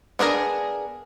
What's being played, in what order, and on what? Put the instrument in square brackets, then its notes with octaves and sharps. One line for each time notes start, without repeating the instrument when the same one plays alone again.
[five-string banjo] B3 D4 G#4 A#4